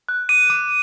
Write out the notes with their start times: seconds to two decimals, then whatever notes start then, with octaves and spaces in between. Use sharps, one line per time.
0.09 F#6
0.29 D6 D#7
0.50 D6